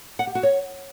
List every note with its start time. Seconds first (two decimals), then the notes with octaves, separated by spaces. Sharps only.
0.19 F#5
0.27 G4
0.35 F#4
0.43 C#5